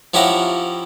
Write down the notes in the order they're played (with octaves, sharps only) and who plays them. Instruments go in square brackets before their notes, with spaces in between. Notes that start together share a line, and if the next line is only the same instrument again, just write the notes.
[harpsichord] F3 C#4 E4 G4 F#5 A#5